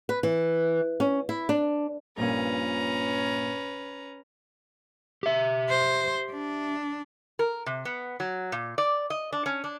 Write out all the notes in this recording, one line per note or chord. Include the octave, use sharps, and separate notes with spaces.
B4
E3
C#4
E4
D4
A#1 G2 A#2 C#4 B4 A#5
G4 E5
C5
D4
A#4
C3
B3
F#3
A#2
D5
D#5
D4
C#4
D4